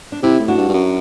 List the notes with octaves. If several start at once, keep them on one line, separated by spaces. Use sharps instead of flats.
D4
C3 C4 E4
A2
D4 F#4
G2
G2
F#2